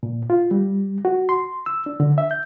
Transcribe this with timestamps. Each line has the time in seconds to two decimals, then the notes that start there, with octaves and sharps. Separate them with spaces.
0.03 A#2
0.30 F4
0.51 G3
1.05 F#4
1.29 C6
1.66 E6
1.86 D4
2.00 D3
2.18 E5
2.31 G6